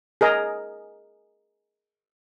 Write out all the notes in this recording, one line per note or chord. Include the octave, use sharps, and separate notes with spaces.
G#4 A#4 D#5